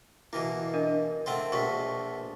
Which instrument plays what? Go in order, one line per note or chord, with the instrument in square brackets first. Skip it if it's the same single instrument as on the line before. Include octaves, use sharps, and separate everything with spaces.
[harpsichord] B2 E3 A#3 [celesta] E4
[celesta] D4 A#4 D#5
[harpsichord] A3 C4 F4 [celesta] A#4 F#5
[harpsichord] A#1 B2 A3 [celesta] C#6 B6